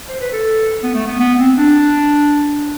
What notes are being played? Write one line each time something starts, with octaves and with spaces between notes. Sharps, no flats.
C5
B4
A4
B3
A3
B3
B3
C4
D4